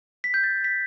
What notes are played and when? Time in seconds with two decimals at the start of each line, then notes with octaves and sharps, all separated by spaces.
0.24 B6
0.34 G6
0.43 A6
0.64 B6